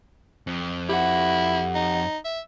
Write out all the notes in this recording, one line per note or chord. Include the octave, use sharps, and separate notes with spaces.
F2
E4 G4 F#5
D#4
E5